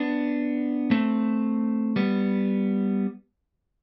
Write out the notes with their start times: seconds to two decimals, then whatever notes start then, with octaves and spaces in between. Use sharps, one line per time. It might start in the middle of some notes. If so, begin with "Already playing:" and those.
Already playing: B3 D4
0.91 A3 C4
1.96 G3 B3